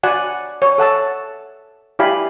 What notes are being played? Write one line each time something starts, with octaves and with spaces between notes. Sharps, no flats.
F#4 D5 F#5 G#5
C#5
A4 F#5 A5 E6
E4 G4 D5 F5 G#5 B5